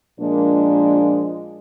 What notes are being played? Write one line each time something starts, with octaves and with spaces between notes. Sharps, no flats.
A#2 F3 G#3 A#3 D4